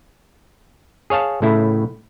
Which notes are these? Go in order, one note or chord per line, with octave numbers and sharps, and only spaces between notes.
G#4 C#5 F5 A5
A2 C#3 A3 E4